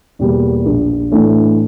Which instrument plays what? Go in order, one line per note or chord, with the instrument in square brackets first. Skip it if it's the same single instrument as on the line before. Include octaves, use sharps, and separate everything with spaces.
[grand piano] E2 B2 G3 A#3
A#1
A2 E3 A3 D4